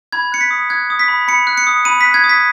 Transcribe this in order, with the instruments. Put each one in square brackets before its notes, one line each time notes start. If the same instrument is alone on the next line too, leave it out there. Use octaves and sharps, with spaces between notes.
[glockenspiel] B5 G#6
F#6 C#7
B6
D#6
F#6 G#6
D#6
B6
B5
B5 C#7
F#6
C#7
D#6
B5 D#7
F#6 B6
G#6
D#6
B6